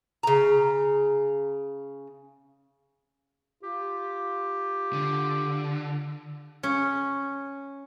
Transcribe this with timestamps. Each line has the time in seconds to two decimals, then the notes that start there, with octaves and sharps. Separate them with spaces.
0.23 C#3 A#5
3.63 F4 G4
4.93 D3
6.63 C#4